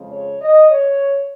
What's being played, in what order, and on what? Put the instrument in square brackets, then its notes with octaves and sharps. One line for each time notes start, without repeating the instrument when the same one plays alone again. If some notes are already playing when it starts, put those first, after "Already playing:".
Already playing: [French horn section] F2 C#3 F3 G#3
C#5
D#5
C#5